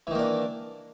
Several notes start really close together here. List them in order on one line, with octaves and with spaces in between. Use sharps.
E3 D#3 A#3 D4